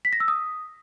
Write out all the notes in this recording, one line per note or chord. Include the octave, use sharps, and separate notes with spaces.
B6
A#6
E6
D#6